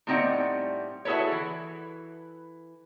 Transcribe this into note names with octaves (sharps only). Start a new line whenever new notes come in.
A2 G3 C4 D#4 D5 F#5
E4 F#4 G#4 A4 B4 C#5
E3